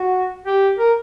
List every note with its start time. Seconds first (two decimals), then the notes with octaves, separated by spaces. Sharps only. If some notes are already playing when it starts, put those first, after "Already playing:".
Already playing: F#4
0.46 G4
0.78 A#4